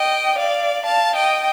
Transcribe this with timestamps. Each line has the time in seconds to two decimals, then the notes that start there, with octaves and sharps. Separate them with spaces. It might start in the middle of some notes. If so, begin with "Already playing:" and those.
Already playing: D#5 G5
0.38 D5 F5
0.84 F5 A5
1.16 D#5 G5